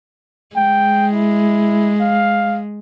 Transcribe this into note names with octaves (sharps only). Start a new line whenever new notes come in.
G#3 G5
E4
F5